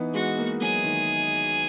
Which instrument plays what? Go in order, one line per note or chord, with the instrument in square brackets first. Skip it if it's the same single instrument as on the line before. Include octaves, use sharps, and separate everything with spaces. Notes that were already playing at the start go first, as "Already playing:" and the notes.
Already playing: [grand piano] E3 B3 D#4
[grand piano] G#3 [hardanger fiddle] F#4
[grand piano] A#3
[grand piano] F#3 [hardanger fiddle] G#4
[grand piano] D#3